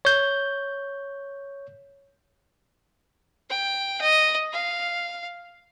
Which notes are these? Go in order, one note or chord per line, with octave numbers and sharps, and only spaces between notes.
C#5 G6
G5
D#5
F5